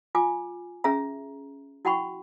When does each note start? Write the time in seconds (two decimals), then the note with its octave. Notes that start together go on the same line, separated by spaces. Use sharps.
0.15 F4 G#5 D6
0.84 C#4 G#4 E5 A#5
1.85 E4 F#4 F#5 G5 B5 C#6